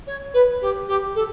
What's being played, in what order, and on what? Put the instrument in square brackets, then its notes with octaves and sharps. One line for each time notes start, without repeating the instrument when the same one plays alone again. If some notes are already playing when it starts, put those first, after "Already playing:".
[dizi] C#5
B4
G4
G4
A4